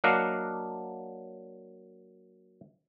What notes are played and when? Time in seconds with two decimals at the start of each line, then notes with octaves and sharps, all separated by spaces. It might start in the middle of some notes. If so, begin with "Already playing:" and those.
0.04 F#3 A#3 D4 D#5 F5 F#5